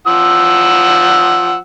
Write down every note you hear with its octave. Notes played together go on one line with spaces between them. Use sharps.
F3 F#5 E6